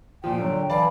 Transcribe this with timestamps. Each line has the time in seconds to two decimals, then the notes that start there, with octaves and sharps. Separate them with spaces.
0.24 A#2 F3 G5
0.37 A#2 D3 F#3
0.70 E3 D5 F5 A5 B5